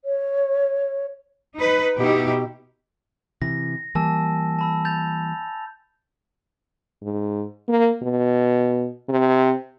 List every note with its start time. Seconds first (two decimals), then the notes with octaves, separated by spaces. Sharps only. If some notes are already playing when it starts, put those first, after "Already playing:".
0.04 C#5
1.57 D#4 B4
2.00 B2 D#4 E4 G4
3.42 C3 E3 A#6
3.95 E3 G3 A#3 G#5 A5 E6
4.59 A5 B5 E6
4.85 G6 A6 F7
7.03 G#2
7.69 A#3
8.02 B2
9.09 C3